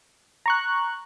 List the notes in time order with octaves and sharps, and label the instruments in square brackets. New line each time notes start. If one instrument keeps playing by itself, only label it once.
[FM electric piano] A#5 C#6 F#6